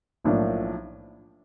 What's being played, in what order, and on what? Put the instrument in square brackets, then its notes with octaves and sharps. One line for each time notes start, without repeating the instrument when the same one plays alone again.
[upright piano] B1 A2 F3 A#3 D4